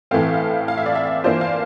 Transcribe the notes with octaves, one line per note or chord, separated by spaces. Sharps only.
A2 E3 A3 C4 F5
F5
F5
E5
D5
E5
E3 A#3 D4 F4 C5
F5